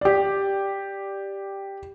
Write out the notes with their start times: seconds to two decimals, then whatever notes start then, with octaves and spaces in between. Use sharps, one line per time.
0.01 G4 D5